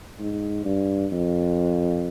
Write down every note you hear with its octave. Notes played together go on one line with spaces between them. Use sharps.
G#2
G2
F2